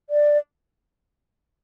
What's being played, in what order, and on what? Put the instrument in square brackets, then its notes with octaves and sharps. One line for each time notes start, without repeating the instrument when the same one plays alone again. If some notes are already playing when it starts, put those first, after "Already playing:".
[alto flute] D5